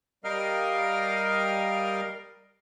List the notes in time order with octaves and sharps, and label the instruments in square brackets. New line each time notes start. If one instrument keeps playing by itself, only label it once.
[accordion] G3 A#4 D#5 F5 G5 F6